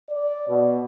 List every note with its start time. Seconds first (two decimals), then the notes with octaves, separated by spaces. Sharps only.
0.11 D5
0.48 B2